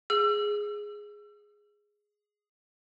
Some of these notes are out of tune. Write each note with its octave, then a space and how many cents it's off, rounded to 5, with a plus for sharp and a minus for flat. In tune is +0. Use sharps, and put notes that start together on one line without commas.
G#4 +0 E6 +35